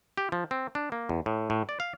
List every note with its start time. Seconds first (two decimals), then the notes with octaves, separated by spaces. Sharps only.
0.18 G4
0.32 F3
0.51 C4
0.75 D4
0.92 A#3
1.09 E2
1.26 A2
1.50 A2
1.69 D5
1.80 F5